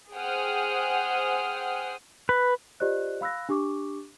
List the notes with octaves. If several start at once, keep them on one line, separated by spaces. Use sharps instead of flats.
G#4 C5 F#5 G5 D#6 F6
B4
F4 G4 C5 D5 D#5 F#6
F5 B5 E6 F#6 A#6
D4 G4 C#6 D6